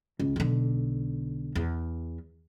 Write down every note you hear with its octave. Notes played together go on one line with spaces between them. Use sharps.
C#2
B1 D3
E2